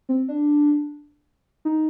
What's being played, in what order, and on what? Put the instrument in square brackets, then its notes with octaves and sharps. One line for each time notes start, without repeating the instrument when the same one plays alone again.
[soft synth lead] C4
D4
D#4